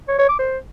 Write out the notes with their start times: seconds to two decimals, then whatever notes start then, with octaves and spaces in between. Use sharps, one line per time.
0.08 C#5
0.19 C#5
0.29 D6
0.39 C5